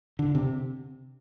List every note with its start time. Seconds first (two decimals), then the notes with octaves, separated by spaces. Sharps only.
0.19 D3
0.35 C3